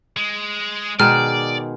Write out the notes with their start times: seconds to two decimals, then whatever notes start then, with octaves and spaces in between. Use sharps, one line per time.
0.17 G#3
1.00 B2 D#3 G#3 D5 F6